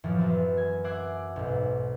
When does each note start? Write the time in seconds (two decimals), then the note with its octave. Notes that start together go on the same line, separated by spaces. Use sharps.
0.04 F#2 A2 E3 F3
0.18 F#3 B3 C4
0.57 G#5
0.84 E5 F#5 D6 G#6 C7
1.36 B1 G#2